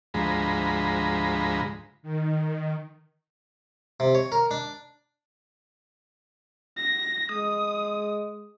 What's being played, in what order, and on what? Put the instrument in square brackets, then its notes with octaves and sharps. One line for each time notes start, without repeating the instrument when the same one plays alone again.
[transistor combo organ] D2 G#2 F3 G#3 A#5 B5
[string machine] D#3
[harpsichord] C3
C#5
A#4
D4
[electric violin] A#6
[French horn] G#3 [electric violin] D#6